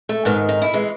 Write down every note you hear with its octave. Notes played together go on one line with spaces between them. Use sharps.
A3
G#2 D#3 B3
D#4
E4
E3 G#3